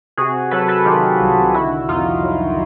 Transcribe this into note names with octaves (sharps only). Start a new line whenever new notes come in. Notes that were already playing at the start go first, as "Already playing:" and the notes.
C3 F#4 G#4
F#3 A4 B4
A4 B4
D#3 F4 G4
C2
D3 E4 F#4
F2 D#4 F4
F#3